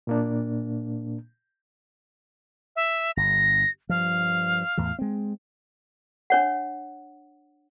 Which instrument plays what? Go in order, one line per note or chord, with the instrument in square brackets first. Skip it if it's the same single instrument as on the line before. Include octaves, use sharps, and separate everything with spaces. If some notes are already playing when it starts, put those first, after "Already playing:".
[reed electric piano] A#2 A#3 D4
[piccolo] E5
[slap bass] G1 [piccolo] A#6
[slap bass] G2 F3 [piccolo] F5
[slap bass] E2 A2 E3
G#3 C4
[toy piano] D4 C#5 F#5